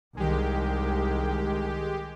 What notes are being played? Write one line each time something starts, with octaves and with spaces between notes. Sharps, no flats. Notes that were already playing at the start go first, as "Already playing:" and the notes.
C2 D#3 G#3 G4